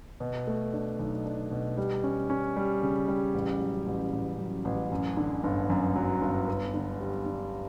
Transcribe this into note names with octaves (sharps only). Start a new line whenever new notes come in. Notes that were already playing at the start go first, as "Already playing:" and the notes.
B2
A3
D4
B1
D4
B2
G3
C#4
C#4
G3
C#3
G3
A1
F#3
A1
A1
F#3
A1
F#2
D3
G1
F#2
F#3
G1
B3
D3
G3
D3